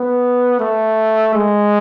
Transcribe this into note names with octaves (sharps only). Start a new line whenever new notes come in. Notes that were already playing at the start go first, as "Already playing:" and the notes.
Already playing: B3
A3
G#3